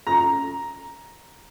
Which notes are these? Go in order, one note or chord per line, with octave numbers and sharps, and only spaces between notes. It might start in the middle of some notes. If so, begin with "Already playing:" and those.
A#5